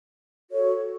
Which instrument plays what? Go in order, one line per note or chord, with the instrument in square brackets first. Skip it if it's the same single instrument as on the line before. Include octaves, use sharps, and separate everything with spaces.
[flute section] F#4 A4 C#5